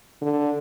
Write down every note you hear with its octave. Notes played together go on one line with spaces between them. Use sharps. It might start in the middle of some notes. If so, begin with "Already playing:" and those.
D3